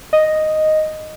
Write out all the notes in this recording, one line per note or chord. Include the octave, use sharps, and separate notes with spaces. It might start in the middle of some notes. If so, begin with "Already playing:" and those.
D#5